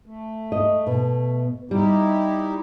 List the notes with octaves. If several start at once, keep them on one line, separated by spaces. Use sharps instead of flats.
A3
D#5
B2
G3 D#4 E4 G4